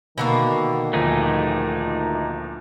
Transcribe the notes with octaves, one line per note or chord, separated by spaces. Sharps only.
B2 D3 D#3 A#3
D2 A#2 F3 A3 D#4 G#4